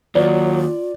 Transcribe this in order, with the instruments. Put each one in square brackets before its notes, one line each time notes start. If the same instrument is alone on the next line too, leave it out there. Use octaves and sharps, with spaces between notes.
[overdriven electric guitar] D#2 [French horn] F#3 [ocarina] F4 [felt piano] D5